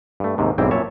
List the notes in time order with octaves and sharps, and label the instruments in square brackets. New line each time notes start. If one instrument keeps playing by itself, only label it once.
[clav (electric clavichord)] G2 A3
D#2 G#2 C3
B1 G#2 G3 C4 E4 G5
F#2 A#2 C#5 E5 A5